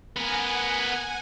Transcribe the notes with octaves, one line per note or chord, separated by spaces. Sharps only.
B3 A#4 F#5 G#5